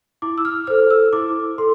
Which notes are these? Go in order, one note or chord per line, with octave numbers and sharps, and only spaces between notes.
E4 D6
E6
F6
A4 C5 F6
E6
E4 D6
A4 C6